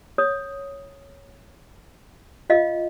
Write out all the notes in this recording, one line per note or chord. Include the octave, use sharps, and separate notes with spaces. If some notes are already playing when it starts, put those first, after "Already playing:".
C#5 D#6
F4 D#5 F5